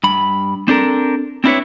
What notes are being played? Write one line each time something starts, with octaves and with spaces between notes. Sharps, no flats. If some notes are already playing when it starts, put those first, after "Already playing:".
G2 B5
C4 D4 A4 A#4
C4 D4 E4 F4 B4 C#5